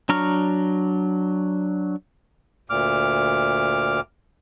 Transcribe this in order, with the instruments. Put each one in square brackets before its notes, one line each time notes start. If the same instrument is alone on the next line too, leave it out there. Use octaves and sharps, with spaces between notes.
[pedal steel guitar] F#3 D4 A#5 C#6 F6
[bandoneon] D2 A#2 D6 F6